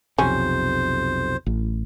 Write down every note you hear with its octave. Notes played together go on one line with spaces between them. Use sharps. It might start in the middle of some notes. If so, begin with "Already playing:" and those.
B1 F2 C3 C#4 C5
A1